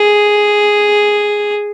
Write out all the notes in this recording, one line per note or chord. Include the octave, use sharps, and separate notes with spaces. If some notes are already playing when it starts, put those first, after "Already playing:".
Already playing: G#4